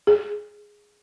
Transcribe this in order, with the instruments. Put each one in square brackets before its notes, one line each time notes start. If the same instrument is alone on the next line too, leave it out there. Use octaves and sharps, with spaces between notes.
[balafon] G#4